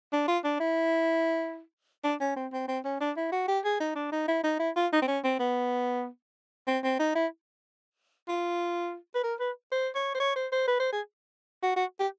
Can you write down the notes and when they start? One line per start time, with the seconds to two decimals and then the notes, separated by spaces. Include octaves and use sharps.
0.12 D4
0.27 F4
0.44 D4
0.60 E4
2.03 D4
2.20 C#4
2.36 C4
2.52 C4
2.68 C4
2.84 C#4
3.00 D4
3.16 E4
3.32 F#4
3.48 G4
3.64 G#4
3.80 D#4
3.95 D4
4.12 D#4
4.28 E4
4.43 D#4
4.59 E4
4.76 F4
4.92 D#4
5.02 C4
5.07 C#4
5.24 C4
5.39 B3
6.67 C4
6.84 C4
6.99 D#4
7.15 E4
8.28 F4
9.15 B4
9.23 A#4
9.39 B4
9.72 C5
9.95 C#5
10.14 C5
10.20 C#5
10.35 C5
10.52 C5
10.68 B4
10.80 C5
10.92 G#4
11.63 F#4
11.76 F#4
11.99 G4